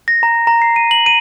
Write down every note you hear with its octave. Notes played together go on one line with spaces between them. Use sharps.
A#6
A#5
A#5
C7
D#7
F#7
D#7